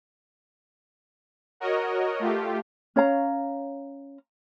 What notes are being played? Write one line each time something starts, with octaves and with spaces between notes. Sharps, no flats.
F#4 A#4 C#5 D#5
A3 F4 G4
C#4 C#5 F5 A#5